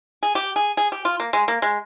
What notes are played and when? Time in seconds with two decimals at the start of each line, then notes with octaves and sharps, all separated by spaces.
0.23 G#4
0.35 G4
0.56 G#4
0.77 G#4
0.92 G4
1.05 F4
1.20 A#3
1.33 G#3
1.48 A#3
1.62 G#3